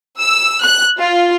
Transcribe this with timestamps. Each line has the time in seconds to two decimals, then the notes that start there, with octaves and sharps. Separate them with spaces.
0.20 E6
0.62 F#6
0.98 F4